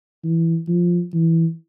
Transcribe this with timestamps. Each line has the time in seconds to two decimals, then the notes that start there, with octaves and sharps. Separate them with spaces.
0.24 E3
0.68 F3
1.14 E3